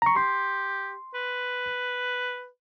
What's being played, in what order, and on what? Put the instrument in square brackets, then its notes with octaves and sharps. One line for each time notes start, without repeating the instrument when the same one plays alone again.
[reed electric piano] A#5 C#6
[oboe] G4 [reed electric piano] C6
[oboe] B4